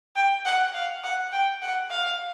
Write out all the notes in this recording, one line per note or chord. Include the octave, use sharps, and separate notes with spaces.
G5
F#5
F5
F#5
G5
F#5
F5